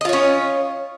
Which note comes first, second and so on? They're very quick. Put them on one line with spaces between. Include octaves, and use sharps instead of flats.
D#5 F4 C#5 C#4